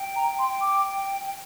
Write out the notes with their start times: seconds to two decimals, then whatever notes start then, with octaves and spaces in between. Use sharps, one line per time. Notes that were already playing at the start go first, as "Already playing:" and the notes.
Already playing: G5
0.16 A#5
0.39 C6
0.61 D6
1.25 G5